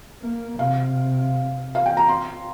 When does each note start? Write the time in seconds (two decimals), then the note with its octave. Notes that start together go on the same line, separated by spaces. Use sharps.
0.22 A#3
0.58 C3 F5
1.75 F5
1.86 G5
1.97 A#5
2.09 C6